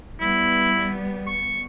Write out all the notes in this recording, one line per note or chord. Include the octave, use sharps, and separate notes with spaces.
G3 B3 E4
C#6